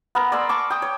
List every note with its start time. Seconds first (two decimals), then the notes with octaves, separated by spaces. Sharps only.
0.15 B3 A#4
0.32 D5 G#5 C6 E6
0.49 A5 C#6 D6
0.70 G5 D#6
0.82 C#5